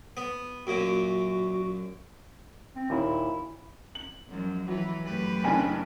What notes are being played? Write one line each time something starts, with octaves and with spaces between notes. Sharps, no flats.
B3
F#2 A#2 F#4
C4
D#2 A#2 E4
F#7
F#2 F3 F#3 G#3
E3 F#3 B4
F#2 A3 G4 B4
F#1 C#3 D4 G5 G#5